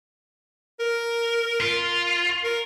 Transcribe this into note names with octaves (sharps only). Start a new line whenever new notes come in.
A#4
F4
A#4